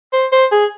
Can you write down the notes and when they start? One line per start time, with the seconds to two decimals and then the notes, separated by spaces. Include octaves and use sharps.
0.13 C5
0.32 C5
0.52 G#4